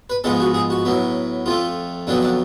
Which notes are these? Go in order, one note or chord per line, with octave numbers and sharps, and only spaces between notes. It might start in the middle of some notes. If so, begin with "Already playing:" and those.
B4
G#2 F3 G#3 B3 A4
F#4
G#4
F#4
A2 F#3 B3
F2 F3 A3 F4
F2 D3 F#3 B3 D4
D4